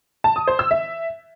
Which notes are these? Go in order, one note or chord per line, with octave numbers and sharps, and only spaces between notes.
A5
D#6
C5
E6
E5